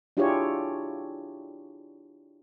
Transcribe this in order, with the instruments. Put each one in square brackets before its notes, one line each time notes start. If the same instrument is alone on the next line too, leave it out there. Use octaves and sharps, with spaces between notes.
[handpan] D4 E4 F4 G4 G#4 C#5